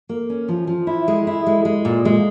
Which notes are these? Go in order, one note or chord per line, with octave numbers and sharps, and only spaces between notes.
A#3
C#4
F3
F3
E4
G#3
E4
G#3
G#3
A#2
G#3